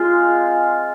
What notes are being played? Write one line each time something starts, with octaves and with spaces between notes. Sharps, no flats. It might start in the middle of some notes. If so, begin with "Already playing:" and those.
Already playing: G#3 C4 F4 G#4